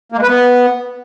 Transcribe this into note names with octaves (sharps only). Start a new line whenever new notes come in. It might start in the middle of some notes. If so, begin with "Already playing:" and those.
A#3
G#3
B4
B3